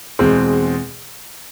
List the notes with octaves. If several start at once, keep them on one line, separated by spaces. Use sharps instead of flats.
E2 B2 G#3 C4